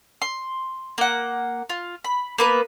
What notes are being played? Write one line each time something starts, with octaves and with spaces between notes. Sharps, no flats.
C6
A#3 F#5
F4
B5
A#3 B3 B4